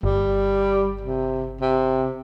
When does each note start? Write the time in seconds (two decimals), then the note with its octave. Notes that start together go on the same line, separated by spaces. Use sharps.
0.03 G1 G3
1.01 C3
1.61 C3